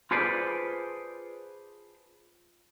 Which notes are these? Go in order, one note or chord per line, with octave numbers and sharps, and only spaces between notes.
F4 G#4 A4 B4 C5 D5